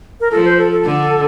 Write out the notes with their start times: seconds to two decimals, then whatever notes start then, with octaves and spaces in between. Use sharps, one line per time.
0.21 A#4
0.31 F3 A4
0.45 C5
0.58 A4
0.72 A4
0.85 D3